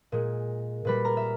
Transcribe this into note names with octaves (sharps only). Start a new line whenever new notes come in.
A#2 G#3
A#2 G3 B4 B5
A#4 A#5
E5